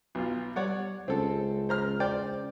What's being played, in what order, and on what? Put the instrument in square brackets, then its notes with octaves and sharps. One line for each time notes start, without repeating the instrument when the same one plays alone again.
[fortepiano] B1 F4 [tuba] B3
[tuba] G3 [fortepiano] C#5 D5 F#5
[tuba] C#2 [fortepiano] C4 A4
[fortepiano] C5 A#5 F6
C5 D5 G5